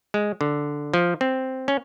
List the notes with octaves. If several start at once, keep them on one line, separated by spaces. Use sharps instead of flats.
G#3
D3
F3
C4
C#4